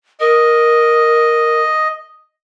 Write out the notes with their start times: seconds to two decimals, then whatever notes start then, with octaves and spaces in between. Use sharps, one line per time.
0.20 A#4 D#5